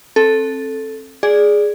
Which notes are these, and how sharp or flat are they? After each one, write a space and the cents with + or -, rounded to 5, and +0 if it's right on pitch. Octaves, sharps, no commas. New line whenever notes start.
C4 +30 A4 +0
G#4 +0 D5 +0